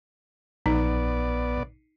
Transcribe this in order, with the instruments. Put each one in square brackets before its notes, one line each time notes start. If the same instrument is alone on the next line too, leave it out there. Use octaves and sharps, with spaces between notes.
[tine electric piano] A#1 [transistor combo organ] B3 D5 [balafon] D#4